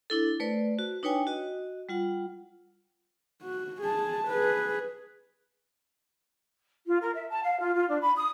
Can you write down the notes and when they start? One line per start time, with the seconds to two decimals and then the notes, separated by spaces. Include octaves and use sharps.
0.10 D4 E4 A4
0.40 A3 B4 C5 D5
0.79 F#4
1.03 D4 D#4 B4 C#5 G5 G#5
1.27 F#4 D#5
1.89 G3 F4 F#5
3.43 F#4
3.82 G#4 A5
4.28 G#4 B4
6.87 F4
7.01 A#4
7.14 E5
7.30 A5
7.43 F5
7.59 F4
7.75 F4
7.89 D4
8.01 B5
8.16 D#6